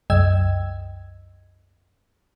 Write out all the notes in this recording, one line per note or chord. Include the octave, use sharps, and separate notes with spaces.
C2 F#2 D#5 G5 E6 G#6